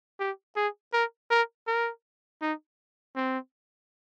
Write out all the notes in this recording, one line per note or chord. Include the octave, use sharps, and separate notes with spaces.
G4
G#4
A#4
A#4
A#4
D#4
C4